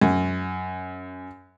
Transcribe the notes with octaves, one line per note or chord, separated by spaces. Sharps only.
F#2